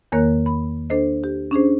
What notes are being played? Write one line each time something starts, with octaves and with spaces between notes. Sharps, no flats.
E2 D#3 A#3 A#4 C#5 F#6
B5
D4 A4 C5 D#5
G4
C#4 D4 G#4 C5